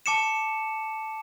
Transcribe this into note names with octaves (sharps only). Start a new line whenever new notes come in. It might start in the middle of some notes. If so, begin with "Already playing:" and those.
A5 D6 C#7 E7